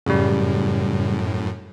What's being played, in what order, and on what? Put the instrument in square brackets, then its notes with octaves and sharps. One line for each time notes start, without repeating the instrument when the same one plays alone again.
[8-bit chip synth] F#2 A2 [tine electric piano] C#3 G3